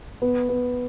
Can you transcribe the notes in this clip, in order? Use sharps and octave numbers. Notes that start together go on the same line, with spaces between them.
B3
B3